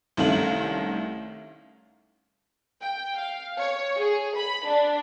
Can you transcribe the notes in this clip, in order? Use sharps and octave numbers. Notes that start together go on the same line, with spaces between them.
C2 D#3 A3 C#4 F5 F#7
G5
F5
C#5
G#4
B5
D4